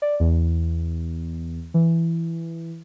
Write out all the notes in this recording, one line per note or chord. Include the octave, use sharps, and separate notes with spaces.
D5
E2
E3